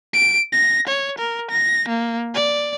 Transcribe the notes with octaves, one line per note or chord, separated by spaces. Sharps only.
D7
A#6
C#5
A#4
A#6
A#3
D5